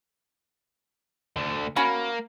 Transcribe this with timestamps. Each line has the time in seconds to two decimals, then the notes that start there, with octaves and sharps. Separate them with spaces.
1.37 D2 D3
1.76 A#3 C#4 F#4 B5